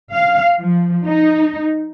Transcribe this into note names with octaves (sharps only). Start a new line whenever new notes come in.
F5
F3
D#4